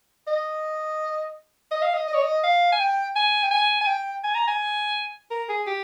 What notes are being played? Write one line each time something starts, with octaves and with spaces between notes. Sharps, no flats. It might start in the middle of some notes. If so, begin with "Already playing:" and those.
D#5
D#5
F5
D#5
D#5
C#5
D#5
F5
G#5
G5
G#5
G5
G#5
G#5
G5
G#5
A#5
G#5
A#4
G#4
G4